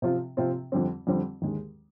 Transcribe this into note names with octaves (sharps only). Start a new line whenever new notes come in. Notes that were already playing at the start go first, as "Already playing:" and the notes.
C3 F3 C4 F4
C3 F3 C4 F4
F2 D3 G3 C4
F2 D3 G3 C4
D#2 D3 G#3